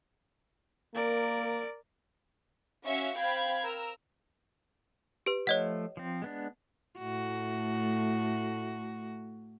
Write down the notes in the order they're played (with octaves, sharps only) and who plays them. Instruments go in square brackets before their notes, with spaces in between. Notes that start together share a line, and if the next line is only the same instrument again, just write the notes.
[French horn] A#3 [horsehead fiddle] A#4 D5
[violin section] C#4 F#4 E5 F5 C#6
C4 F5 G5 B5 G#6
A#4 A#5 E6
[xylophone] G4 B4
[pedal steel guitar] F3 A3 [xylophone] C#5 D#5 F#5
[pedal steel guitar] F3 C4
G#3 B3 D4
[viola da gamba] A2 A3 F#4